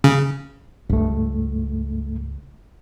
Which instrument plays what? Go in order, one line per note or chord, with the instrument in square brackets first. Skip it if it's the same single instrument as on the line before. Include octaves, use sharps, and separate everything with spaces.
[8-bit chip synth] C#3
[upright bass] C#2 [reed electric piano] G2 A3